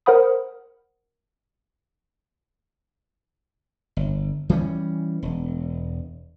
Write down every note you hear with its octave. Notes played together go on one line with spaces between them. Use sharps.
A#4 C5 F#5 B5 D#6
G1
E3 G3 A#3 C#4
E1